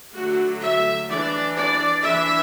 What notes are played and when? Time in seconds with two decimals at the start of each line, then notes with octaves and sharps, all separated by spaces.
0.14 D3 F#3 A3 F#4
0.62 E5
1.10 E3 D4 D5
1.56 D5
2.04 E3 D4 E5